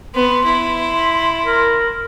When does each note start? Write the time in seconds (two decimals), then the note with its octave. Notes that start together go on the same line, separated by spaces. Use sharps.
0.15 B3 C6
0.45 E4
1.44 A#4